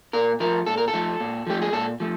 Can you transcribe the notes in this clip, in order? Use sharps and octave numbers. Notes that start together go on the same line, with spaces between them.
A#2 A#4
F3 A3 A#4
A#2 A4
A#4
A4
F3 A3
A#2
F3 A3 G4
G#4
A#2 A4
F3 A3